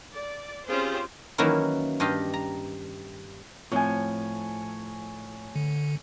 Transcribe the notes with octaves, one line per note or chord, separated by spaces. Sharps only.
D5
C4 C#4 F4 G4 G#4 C5
D#3 E3 F#3 A#3 C#4 E4
G2 G4 D#5 F5
A#5
A2 F3 C4 C#5 G#5
D3